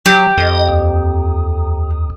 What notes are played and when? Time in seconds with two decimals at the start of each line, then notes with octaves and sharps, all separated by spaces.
0.06 F#3 G4
0.38 F2 D#5
0.68 D#2